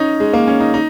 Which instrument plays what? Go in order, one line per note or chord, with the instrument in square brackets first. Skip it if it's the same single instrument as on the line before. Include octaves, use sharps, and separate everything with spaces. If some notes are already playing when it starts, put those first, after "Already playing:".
Already playing: [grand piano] C#4 D#4
G#3
A#3
C#4
D#4
D#4